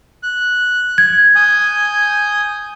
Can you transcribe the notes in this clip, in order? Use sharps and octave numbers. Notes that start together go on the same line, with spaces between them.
F#6
G#6
G#5 D#6 G6